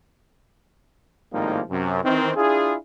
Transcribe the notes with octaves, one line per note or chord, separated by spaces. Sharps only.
G#1 A2 F3 G3 A#3 D#4
F#2 C3
D#3 E3 C4
D4 E4 F4 G#4